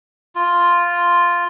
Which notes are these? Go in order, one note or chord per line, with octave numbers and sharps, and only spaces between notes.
F4